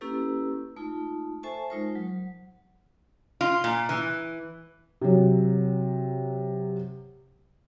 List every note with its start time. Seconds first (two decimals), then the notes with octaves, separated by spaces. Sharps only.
0.01 A#3 C#4 E4 G4 A4 B4
0.76 A3 D#4 F4
1.43 A4 C5 E5 G#5 A5 C#6
1.70 G#3 D#4 F4 A#4 C5
1.95 F#3
3.41 F4
3.64 A#2
3.89 E3
5.01 C3 F#3